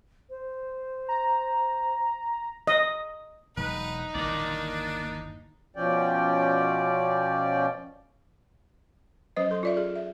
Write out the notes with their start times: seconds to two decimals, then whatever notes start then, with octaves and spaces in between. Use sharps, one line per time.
0.30 C5
1.08 A#5
2.67 D#5
3.57 E1 F#3 G#3 D#4 B4
4.15 G1 D#2 E3 A#3 D4 D5
5.76 B2 F3 C#4 D5 G5
9.36 F#3 C#4 B4 C5 D#5
9.51 A4 C6
9.63 F4 D5 E5
9.77 G#4
9.96 E5